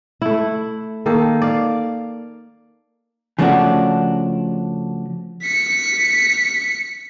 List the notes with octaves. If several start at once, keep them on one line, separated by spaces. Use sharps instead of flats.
A3 E4
D#3 A#3 A4
D5 F5
C#3 F3 A3 C#4 D4 F#4
B6 C#7